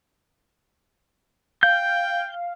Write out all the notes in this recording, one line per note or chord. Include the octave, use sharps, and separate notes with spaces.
F5 G5 G6